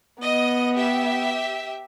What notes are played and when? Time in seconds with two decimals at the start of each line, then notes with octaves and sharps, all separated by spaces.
0.22 B3 D#5
0.76 G4 E5